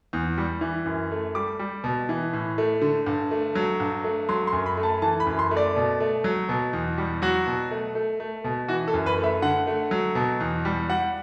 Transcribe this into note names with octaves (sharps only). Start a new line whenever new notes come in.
E2
G3
E3
F#2
A3
G3 D6
G3
B2
E3
A2
A3
D3
G2
A3
F#3
G2
A3
F#3 C6
C6
F#2
B5
A3
A5
E3 A5
B5
F#2
C6
A3
D5
B2
A3
F#3
B2
E2
G3
F#3 F#4
B2
A3
A3
A3
B2
E3 F#4
A4
F#2
B4
A3
E5
D3 F#5
A3
F#3
B2
E2
G3
G3 F#5